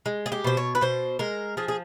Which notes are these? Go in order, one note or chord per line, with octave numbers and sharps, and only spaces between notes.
G#3
G#4
G4
B2 C5
C#5
B4
B2 C5
G#3 A#4
F3 G#4
G#4